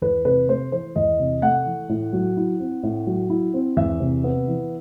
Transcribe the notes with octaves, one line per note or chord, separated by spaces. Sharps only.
E2 B4
C3 B4
A3 C5
E3 C5
E2 D#5
C3
A3 F#5
E3
A2
F#3
E4
C4
A2
F#3
E4
C4
E2 E5
C3
B3
E3